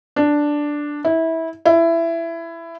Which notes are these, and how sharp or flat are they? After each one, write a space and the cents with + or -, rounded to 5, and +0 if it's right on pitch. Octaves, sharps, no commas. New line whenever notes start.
D4 +0
E4 -20
E4 +15